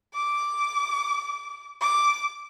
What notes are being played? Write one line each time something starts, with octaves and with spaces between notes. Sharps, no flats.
D6
D6